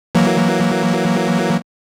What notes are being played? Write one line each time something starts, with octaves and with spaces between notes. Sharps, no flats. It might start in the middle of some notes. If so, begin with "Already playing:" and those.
E3 F#3 A#3